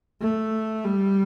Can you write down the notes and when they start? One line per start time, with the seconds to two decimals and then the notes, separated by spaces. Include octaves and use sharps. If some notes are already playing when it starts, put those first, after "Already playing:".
0.21 A3
0.85 G3